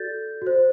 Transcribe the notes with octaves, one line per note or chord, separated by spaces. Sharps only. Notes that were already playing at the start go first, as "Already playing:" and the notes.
Already playing: F#4 A4 D5 G6 A6
F#4 C5